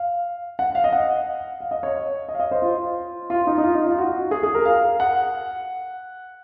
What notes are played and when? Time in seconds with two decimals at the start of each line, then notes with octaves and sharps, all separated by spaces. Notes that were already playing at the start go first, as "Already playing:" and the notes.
Already playing: F5
0.59 F#5
0.75 F5
0.84 D#5
0.92 F#5
1.60 F5
1.71 D#5
1.83 C#5
2.28 D#5
2.35 F5
2.40 D#5
2.51 C5
2.62 F4
3.30 F4
3.47 D#4
3.58 D#4
3.64 F4
3.75 D#4
3.86 F4
3.98 F#4
4.31 G#4
4.43 G#4
4.54 A#4
4.65 F5
5.00 F#5